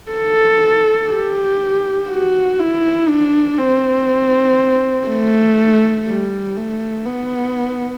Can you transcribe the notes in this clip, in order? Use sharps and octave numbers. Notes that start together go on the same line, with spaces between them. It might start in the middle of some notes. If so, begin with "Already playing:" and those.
A4
G4
F#4
E4
D4
C4
A3
G3
A3
B3